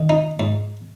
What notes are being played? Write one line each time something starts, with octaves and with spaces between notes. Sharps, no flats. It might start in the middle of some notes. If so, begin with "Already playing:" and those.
Already playing: D#3
D#4
G#2